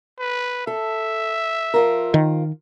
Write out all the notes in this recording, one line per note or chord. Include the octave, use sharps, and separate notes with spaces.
B4
A4 E5
F3 F4 A#4
D#3